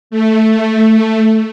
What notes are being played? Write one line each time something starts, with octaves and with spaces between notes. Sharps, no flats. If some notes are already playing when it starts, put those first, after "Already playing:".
A3